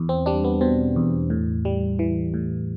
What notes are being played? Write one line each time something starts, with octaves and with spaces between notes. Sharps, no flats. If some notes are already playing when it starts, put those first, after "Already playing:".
Already playing: E2
C4
G3 D4
B3
B2 C4
E2
A2
G3
E3
A2